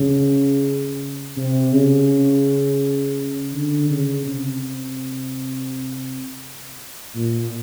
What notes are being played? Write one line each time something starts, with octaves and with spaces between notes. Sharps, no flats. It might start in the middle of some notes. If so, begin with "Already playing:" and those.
Already playing: C#3
C3
C#3
D3
C#3
C3
A#2